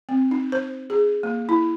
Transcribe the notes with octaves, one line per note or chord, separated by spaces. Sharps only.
C4
D#4
C5
G#4
A#3
E4